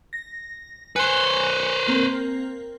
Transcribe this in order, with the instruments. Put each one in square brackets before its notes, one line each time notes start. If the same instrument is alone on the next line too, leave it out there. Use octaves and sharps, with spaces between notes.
[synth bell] A#6
[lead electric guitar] B4 C5 [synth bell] G#5 F#6 C#7
[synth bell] A#3 C4 A#4